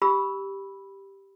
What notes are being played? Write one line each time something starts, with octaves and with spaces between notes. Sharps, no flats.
G4 B5 E6